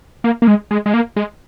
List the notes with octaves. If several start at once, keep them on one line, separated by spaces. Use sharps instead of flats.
A#3
A#3
G#3
G#3
G#3
A#3
G#3